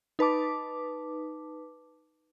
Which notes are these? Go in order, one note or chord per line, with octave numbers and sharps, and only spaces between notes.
D#4 B4 A5 D6